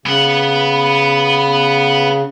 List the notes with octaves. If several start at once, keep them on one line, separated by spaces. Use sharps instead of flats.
C#3 B3 F#5